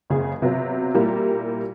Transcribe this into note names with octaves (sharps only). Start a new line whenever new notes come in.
F#1 C#3 G#4
C3 F#3 B3 F4
A#2 G3 A#3 E4 F4 G4